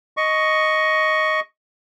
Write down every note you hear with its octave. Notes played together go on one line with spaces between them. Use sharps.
D#5 C#6